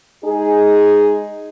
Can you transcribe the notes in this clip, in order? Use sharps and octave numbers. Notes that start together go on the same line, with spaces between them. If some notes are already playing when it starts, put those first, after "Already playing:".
G#3 D#4 G#4